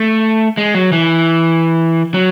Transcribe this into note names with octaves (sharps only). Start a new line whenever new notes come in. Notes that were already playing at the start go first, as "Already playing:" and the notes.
Already playing: A3
G#3
F#3
E3
F#3